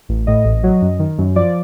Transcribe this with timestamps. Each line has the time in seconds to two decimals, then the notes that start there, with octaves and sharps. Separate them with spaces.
0.09 A1
0.27 A2 D#5
0.45 A1
0.64 F#3
0.82 F#2
0.99 D#3
1.18 F#2
1.36 F3 D5